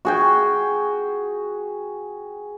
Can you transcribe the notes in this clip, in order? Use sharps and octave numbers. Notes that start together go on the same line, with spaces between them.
F#4 G#4 G5